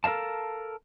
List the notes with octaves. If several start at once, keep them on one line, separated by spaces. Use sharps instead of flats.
A4 A#4 D#5 F5 A5